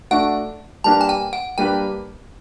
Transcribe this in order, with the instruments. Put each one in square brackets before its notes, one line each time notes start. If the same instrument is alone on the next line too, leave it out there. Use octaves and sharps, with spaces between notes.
[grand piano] A3 D4 F#4 [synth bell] F#5
[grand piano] G3 A#3 D4 G4 B4 [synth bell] A5
[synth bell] G#5
G5
F#5
[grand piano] G3 A#3 D4 G4 B4 [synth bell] G5